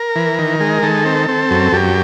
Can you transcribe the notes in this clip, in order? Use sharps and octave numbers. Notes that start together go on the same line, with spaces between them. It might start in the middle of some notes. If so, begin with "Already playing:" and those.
Already playing: A#4
E3
D#3
G#3
D#3 A4
C4
C4
F#2
F#2 G4